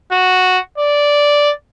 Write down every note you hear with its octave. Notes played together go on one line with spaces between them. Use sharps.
F#4
D5